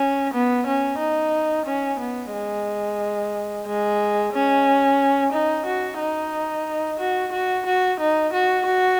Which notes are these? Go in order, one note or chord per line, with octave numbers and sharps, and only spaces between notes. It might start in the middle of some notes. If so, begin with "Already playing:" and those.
Already playing: C#4
B3
C#4
D#4
C#4
B3
G#3
G#3
C#4
D#4
F#4
D#4
F#4
F#4
F#4
D#4
F#4
F#4